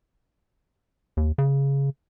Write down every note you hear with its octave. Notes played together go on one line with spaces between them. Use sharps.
D#2
C#3